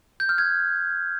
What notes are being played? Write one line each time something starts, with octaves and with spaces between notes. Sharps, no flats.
G6
F6
G#6